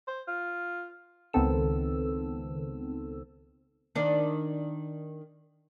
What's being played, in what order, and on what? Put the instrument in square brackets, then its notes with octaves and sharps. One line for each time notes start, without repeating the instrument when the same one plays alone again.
[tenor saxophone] C5
F4
[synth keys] C#2 D#3 B3 C4 A4 E6
[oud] D#3 D4